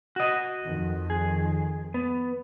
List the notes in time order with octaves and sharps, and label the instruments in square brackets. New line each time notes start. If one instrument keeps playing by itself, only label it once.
[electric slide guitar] F#4 D#5
[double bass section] F2 D#3
[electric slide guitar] G#4
B3